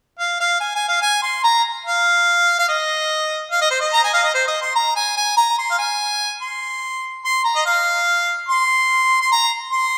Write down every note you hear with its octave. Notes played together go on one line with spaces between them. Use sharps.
F5
F5
G#5
G#5
F5
G#5
C6
A#5
F5
F5
D#5
F5
D#5
C5
D#5
A#5
G#5
F5
D#5
C5
D#5
C6
A#5
G#5
G#5
A#5
C6
F5
G#5
C6
C6
A#5
D#5
F5
C6
C6
A#5
C6